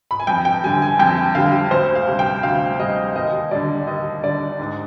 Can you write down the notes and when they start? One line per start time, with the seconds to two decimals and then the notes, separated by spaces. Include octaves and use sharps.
0.11 B5
0.20 G#5
0.27 F2 G5
0.45 G5
0.64 D3 G3 G#5
0.82 G#5
0.99 F2 G5
1.35 D3 G3 F5
1.71 D2 C5
1.95 F5
2.07 C3 G3
2.19 G5
2.43 D2 F5
2.80 C3 G3 D#5
3.15 D#2 D#5
3.51 D3 G3 D5
3.87 D#2 D#5
4.23 D3 G3 D5
4.60 G#2